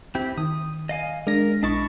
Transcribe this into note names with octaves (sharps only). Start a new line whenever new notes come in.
C4 E4 G4
D#3 D#6
D#5 F5 G#5
G#3 D4 A#4 A#6
A#1 D4 E4 D#5 C#6 A6